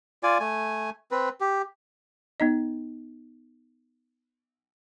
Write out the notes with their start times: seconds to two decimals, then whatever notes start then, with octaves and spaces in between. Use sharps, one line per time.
0.23 F4 D5 G#5
0.40 A3 G#5
1.11 C4 B4
1.41 G4
2.40 B3 D#4 D#5